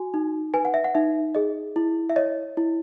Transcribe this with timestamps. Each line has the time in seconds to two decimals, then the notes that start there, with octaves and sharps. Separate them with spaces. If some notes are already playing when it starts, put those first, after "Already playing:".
Already playing: F#4 G#5
0.14 D#4
0.54 B4 G#5
0.65 F#5
0.74 E5
0.84 F#5
0.95 D#4 E5
1.35 G#4 D#5
1.76 E4
2.10 E5
2.16 C#5 D#5
2.57 E4